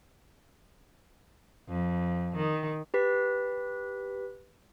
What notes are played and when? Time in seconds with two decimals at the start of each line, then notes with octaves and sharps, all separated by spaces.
1.69 F2
2.36 D#3
2.94 G4 B4 B6